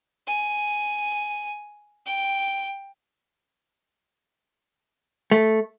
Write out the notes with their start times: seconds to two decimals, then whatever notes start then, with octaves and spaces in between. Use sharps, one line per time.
0.27 G#5
2.06 G5
5.31 A3